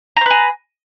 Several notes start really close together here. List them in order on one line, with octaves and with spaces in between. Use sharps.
A#5 C5 B4 G#4